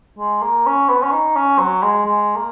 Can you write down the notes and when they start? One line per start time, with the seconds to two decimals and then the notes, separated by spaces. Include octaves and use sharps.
0.19 G#3
0.42 A#3
0.66 C#4
0.89 B3
1.02 C#4
1.12 D#4
1.35 C#4
1.58 F#3
1.82 G#3
2.05 G#3
2.36 A#3